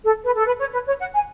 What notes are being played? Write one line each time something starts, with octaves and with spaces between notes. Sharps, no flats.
A4
B4
A4
B4
C#5
B4
C#5
F#5
G#5